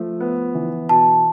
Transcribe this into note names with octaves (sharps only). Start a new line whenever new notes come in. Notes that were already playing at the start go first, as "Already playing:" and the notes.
Already playing: F3 A3
B3
E3
B2 A5